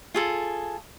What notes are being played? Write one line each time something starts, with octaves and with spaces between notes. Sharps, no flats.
F4 G#4 A4